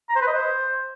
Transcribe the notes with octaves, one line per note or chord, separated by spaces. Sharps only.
A#5
C5
B4
D#5
C5